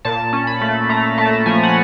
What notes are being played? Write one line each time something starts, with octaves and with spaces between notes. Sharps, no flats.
A#2 A5
C#4
B5
A3
A3 A#5
A3 A5
F3 G#5
F#5